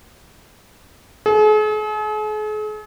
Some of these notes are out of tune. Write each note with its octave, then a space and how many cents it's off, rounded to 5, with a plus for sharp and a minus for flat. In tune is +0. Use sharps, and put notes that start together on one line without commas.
G#4 +45